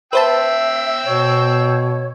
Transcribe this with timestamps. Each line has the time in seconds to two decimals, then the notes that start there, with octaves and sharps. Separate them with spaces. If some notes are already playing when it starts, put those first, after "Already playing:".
0.13 B4 C5 E5 G5 A5 E6
1.05 B2 C#5